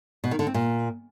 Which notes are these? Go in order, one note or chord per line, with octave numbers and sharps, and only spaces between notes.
B2
D#3
D3
C4
A#2